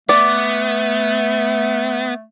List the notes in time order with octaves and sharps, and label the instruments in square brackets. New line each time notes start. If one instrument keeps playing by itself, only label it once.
[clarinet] A3 [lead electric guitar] B3 [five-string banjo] D5